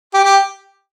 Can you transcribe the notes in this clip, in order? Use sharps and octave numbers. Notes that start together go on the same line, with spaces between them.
G4
G4